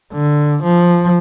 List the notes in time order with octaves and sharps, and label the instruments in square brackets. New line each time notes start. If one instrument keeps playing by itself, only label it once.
[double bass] D3
F3